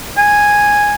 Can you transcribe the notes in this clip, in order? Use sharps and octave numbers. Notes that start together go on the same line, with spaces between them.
G#5